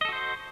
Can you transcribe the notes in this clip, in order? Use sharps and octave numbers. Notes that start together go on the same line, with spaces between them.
F#4 A4 C5 D#5